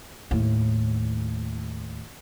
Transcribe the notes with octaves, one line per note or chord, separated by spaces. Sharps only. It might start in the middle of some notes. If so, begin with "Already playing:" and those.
D#2 A2